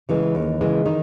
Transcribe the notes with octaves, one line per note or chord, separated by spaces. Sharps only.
C#3 E3 G#3
D#2
C#3 E3 G#3
D#3 D#4